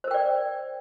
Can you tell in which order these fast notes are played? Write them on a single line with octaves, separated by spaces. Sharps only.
C5 A#4 G5 D5